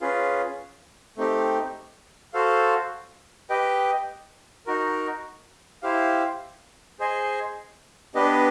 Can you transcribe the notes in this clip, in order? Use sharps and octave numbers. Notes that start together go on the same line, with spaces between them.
C#4 F4 G#4 B4
A3 C4 D#4 G4
F#4 A4 C5 F5
G4 B4 D#5 G5
D#4 F#4 A#4
E4 G4 C5 F5
G#4 C5 D#5 G#5
B3 D4 G4 B4 D#5